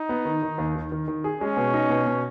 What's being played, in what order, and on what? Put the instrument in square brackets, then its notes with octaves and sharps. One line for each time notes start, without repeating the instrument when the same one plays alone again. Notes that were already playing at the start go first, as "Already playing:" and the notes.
Already playing: [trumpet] D#4
[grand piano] B3
D#3
D#3
D#2
D#3
D#3
D#3
G#4
[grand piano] G#3 [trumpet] C#4
[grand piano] B2
D#4
B2
B2